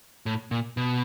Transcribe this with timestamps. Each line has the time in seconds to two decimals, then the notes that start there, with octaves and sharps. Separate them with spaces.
0.26 A2
0.51 A#2
0.77 B2